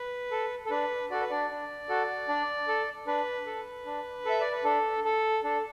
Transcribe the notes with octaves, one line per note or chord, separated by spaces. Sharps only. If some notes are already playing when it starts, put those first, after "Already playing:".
Already playing: B4
A4
A4
D4 B4
F#4 A4 D5
B4
D4 D5
D4
F#4 A4
D4
A4
D4 B4
A4
D4
A4 E5
D5
B4
D4 A4
A4
D4 A4